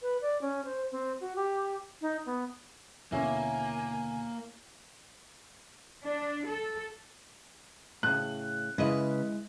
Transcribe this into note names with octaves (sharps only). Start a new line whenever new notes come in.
B4
D5
C#4
C5
C4
F#4
G4
D#4
B3
D#2 B2 D3 A#3 C#4 E4 G#5
D4
A4
A2 C#3 F#6
C#3 G#3 E4 B4 D#5